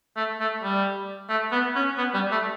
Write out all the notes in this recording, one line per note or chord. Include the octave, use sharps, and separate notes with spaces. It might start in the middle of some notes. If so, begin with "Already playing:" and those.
A3
A3
G3
A3
B3
C#4
B3
G3
A3